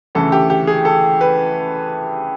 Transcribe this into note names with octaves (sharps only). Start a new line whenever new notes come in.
D2 C#3 E3 A3 A4
G4
G4
G#4
A4
B4